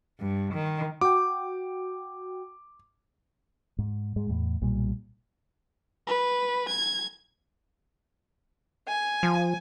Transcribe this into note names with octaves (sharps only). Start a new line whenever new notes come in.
G2
D#3
F#4 G5 D6
G#2
G#2 G#3
E2 A2
B1 A#2 G3
B4
G#6
G#5
F3